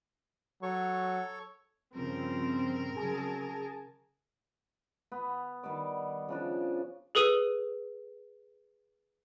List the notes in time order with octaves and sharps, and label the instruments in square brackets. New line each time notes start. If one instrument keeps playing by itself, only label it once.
[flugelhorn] F#3 [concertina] A4 C#5 C#6
[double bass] G2 C#3 [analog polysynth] F3 [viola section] C4 [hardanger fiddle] A#4
[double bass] C#3 F#3 [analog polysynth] G#4 G#5 A5
[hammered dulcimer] B3
D#3 G3 B3 D5
C#3 F3 D4
[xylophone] G#4 A4 B4 D#6 D#7